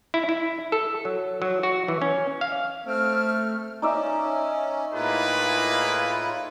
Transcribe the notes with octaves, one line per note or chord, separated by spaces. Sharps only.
E4
E4
A4
F#3
F#3
F#4
E3
C#4
F5
A3 C4 F6
C#4 D#4 D5 E5
A2 A#3 E4 F4 G#4 B4